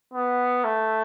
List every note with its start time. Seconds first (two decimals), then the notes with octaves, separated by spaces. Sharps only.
0.14 B3
0.64 A3